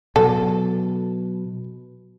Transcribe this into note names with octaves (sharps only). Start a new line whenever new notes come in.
B2 F#3 A4